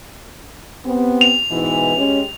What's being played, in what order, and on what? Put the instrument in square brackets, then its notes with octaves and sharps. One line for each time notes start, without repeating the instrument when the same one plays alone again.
[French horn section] B3 C4 G4
[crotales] F7
[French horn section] G#2 B2 E3
G#3 C#4 G4